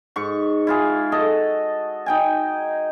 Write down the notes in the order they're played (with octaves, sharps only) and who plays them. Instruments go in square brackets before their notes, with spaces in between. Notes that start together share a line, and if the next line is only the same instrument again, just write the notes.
[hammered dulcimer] G#2 C#6
E4 F4 G#4
F#4 A4 D#5
D#4 G5 G#5